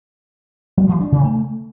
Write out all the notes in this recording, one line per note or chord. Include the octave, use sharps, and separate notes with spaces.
F#3
E3
D4
C3
A3